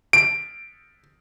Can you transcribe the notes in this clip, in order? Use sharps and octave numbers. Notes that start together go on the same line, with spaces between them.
D7